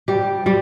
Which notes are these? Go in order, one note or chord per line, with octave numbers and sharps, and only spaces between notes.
G3 G4
G3 G4